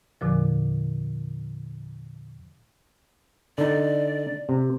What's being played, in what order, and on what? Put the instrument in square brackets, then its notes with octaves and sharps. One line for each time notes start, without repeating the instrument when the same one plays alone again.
[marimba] E2 A#2 D3 F3
[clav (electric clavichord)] D3 D#4 [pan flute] D5
[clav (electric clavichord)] C3